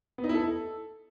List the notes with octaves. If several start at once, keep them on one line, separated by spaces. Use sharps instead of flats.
B3
D#4
E4
A4